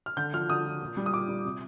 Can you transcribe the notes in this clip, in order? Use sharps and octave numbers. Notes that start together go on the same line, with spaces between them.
F6
D3 G6
F3 F6
D3 D#6
F3
A#2
G3
D#6
A#2 D6
G3
C3